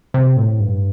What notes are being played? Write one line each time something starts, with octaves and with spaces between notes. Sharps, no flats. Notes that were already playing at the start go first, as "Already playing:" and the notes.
C3
A2
G2